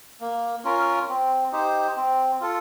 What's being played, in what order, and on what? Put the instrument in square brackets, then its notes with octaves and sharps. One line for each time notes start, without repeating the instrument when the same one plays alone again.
[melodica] A#3
C#4 F4 A#4
C4
D#4 G4 C5
C4
F4 A4